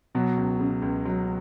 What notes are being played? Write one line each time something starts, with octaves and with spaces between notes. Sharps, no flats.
B2 F#3
C#2
C#3
C#2
F#3